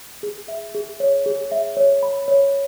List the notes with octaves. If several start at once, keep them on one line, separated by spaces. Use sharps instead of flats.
G#4
E5
G#4
C#5
G#4
E5
C#5
B5
C#5